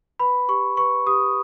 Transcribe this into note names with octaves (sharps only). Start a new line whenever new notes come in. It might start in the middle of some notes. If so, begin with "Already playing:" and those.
B4 B5
G4 C#6
B4 C#6
G4 D#6